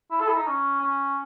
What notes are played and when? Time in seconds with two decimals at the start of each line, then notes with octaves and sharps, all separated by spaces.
0.10 E4
0.20 A4
0.29 E4
0.37 D#4
0.46 C#4
0.81 C#4